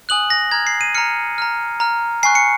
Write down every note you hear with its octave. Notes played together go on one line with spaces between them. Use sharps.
G#5 D#6 F#6 F#7
A#6
A#5 F6 G#6
C7
D#7
A#5 F6 C#7
A#5 F6
A#5 F6
G#5 C#6 F#6 C7
C#7